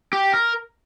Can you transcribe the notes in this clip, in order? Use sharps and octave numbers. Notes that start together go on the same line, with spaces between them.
G4
A#4